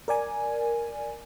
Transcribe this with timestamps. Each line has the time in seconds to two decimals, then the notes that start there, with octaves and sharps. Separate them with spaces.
0.08 A#4 D5 G#5